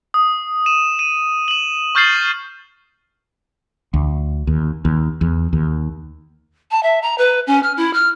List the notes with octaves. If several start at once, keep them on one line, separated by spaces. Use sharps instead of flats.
D#6
D#7 E7
D#7
E7 F#7
C#6 F6 G6 A6 C7 F#7
D2
D#2
D#2
E2
D#2
A5
E5
A#5
B4
C#4
F6
E4
F6